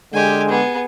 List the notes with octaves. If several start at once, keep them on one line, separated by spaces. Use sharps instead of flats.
D3 G#3 G4 G#5
B3 G#4